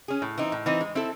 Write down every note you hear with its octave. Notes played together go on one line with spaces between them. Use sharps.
C#4 G#4
A2
E3 C4 D#4
A2
E3 C4 D#4
G#3
C4 E4 A4